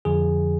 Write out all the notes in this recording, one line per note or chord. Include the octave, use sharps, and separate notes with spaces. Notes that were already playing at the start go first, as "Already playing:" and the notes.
F2 D3 F3 G#4